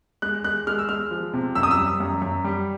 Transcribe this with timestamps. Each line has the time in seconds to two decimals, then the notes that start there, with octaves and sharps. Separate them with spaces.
0.22 G#3 F#6
0.44 G#3 F#6
0.67 G#3 F6
0.79 E6
0.89 G#3 F6
1.11 F3
1.33 C3
1.55 F#2 E6
1.63 D#6
1.71 E6
1.78 G3
2.00 F#2
2.22 F#2
2.44 G3